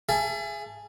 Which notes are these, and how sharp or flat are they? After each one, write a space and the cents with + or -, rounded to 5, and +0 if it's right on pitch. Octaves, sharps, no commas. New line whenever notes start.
G#4 +0 E5 +35 A5 +0